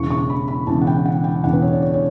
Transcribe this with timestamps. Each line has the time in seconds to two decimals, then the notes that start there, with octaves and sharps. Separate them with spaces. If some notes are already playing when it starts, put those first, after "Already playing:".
Already playing: E1 E2 C#3 C#6
0.10 C#6
0.30 B5
0.48 B5
0.67 E1 E2 C#3 A5
0.81 F#5
0.87 G5
1.05 F#5
1.24 G5
1.44 E1 E2 C#3 F#5
1.53 B4
1.62 C#5
1.73 D5
1.82 C#5
1.94 C#5